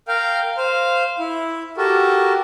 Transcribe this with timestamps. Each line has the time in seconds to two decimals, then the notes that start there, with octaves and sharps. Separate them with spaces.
0.08 A#4 F5 G5
0.57 C5 F5
1.19 E4
1.77 F#4 G4 A4 A#4